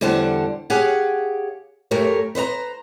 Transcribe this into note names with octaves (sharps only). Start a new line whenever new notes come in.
E2 D3 G3 C5 F#5 A5
G4 G#4 C#5 F5 F#5
F#2 A3 G4 A#4 C#5
B4 C5 D#5 A#5